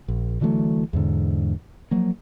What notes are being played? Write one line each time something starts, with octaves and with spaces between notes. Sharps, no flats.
A#1
D3 E3 F#3 A3
E2 G#2 D3
F3 F#3 A#3